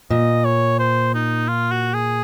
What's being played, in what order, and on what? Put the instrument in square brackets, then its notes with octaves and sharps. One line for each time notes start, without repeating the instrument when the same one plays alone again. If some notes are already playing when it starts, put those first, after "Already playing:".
[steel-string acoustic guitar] A#2 [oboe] D#5
[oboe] C#5
C5
D#4
F4
F#4
G#4